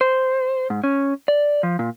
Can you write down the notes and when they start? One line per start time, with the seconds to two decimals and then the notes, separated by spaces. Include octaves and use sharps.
0.01 C5
0.70 G#2
0.84 C#4
1.28 D5
1.63 F3
1.79 A#2